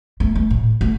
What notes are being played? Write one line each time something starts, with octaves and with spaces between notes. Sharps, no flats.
A3
A3
A2
A3